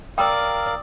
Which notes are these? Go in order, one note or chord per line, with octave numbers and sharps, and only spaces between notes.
A#4 D5 F5 G5 A#5 D#6 E6